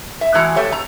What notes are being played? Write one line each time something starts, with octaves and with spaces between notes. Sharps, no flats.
E5
A2 E3 G#3 F#4 A#5
F3 A3 G4 C#5 E5
F2 A#5